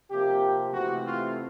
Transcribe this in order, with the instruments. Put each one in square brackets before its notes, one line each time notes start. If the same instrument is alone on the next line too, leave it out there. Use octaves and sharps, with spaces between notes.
[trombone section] C3 F3 A#3 G4
C3 E3 A3 C4 F#4
F4